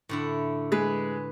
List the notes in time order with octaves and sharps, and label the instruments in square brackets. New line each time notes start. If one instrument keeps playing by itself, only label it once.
[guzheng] A2 D3 E4
[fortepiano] G#3 [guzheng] B4